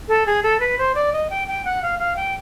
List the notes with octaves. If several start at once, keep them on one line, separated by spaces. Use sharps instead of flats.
A4
G#4
A4
B4
C5
D5
D#5
G5
G5
F#5
F5
F5
G5